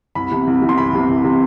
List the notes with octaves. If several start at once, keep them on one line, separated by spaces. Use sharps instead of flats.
C2 B5
C3 E3
C2
C3 E3
C6
C2 B5
C3 E3
C2
C3 E3